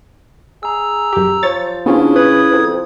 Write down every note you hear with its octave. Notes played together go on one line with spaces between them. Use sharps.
G#4 A#5 E6
F#2 G4
F3 C#5 A6
C#3 B3 C#4 D4 E4 F4
E4 B4 D#6 G#6
F2